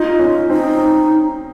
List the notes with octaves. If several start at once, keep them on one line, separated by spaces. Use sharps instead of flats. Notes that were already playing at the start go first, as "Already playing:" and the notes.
Already playing: D#4 F4
C#4
C4 D#4